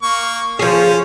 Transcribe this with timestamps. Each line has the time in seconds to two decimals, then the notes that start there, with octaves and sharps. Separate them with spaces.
0.03 A#3 C#6
0.59 F3 C#4 G#4